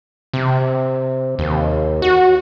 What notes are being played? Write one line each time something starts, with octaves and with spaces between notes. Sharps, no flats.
C3
D#2
F#4